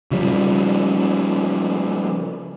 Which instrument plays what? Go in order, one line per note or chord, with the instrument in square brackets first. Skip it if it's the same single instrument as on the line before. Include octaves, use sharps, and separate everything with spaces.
[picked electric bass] C#3 F3 G3